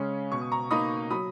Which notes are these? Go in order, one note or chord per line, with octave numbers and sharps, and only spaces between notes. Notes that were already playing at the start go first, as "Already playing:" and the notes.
Already playing: C#3 G#3 C#4 C#6
B2 C#6
D#6
A#5 C#6
A#3 D#4 B5 D#6
F#3 B5 D#6